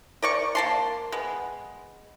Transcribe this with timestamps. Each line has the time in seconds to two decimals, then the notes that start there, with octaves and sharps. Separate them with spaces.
0.22 A#4 D5 C#6
0.55 A#3 A5 C6
1.12 G#3 B3